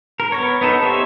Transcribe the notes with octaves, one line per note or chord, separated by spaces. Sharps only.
A#4
B3 A#4 C#5
B3 D#4 A4
G4 C5 C#5 E5